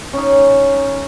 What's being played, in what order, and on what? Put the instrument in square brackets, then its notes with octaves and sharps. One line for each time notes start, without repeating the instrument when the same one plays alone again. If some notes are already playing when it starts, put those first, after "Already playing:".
[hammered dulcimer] C#4 D#4